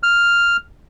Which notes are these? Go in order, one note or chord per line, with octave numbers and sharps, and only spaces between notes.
F6